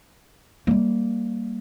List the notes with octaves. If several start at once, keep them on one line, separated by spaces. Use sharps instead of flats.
G3 A#3